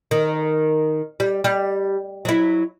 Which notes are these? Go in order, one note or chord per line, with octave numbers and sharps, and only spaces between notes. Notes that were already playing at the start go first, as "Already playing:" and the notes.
D#3
G3
G3
F#3 E4